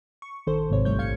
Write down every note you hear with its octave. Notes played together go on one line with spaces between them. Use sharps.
C#6
A#1 D#3 A4 C5
G#1 G#2 C3 C#5
C2 A2 G3 C#5 G6
A#1 F5 G#6 C#7